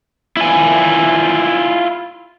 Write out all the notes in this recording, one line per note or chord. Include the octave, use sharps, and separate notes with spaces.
E4 F4 G#5